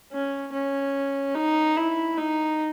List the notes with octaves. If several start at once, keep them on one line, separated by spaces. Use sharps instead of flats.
C#4
C#4
D#4
E4
D#4